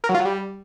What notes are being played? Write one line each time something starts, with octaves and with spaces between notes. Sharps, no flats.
A#4
F#3
F4
F#3
G3